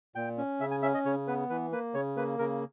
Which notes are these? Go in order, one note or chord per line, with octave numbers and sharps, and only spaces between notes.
A#2 G5
C#4
C#3 E5
G#5
C#4 E5
D#5
C#3 C#5
B3 B4
E3 B4
A#3 B4
C#3 C#5
A#3 B4
C#3 A#4